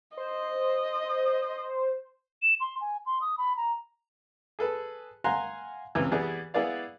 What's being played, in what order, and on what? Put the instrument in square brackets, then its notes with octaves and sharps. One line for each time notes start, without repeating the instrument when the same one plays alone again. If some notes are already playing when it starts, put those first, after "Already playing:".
[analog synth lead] C5 [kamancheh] D#5
[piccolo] E7
C6
G#5
C6
D#6
B5
A#5
[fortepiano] G#4 A4 B4
F5 F#5 G#5 A#5 C6 F#6
C#2 C3 E3
E3 G3 B3 G#4 B4 D5
B3 E4 G#4 B4 D5 F5